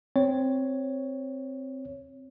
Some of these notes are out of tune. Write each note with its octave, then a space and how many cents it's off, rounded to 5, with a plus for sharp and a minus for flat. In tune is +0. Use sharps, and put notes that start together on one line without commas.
C4 +0 C#5 +5